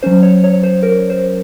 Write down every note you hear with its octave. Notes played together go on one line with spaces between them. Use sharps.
F#3 C#4 C5
C#5
C#5
C5
A#4
C5